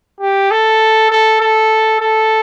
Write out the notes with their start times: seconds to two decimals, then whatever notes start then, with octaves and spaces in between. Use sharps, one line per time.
0.21 G4
0.51 A4
1.11 A4
1.40 A4
2.01 A4